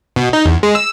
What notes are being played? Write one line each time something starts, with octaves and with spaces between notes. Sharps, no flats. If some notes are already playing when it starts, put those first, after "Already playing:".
B2
D#4
E2
G#3
E6